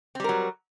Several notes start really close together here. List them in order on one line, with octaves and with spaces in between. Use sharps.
C4 G3 A#4 F#3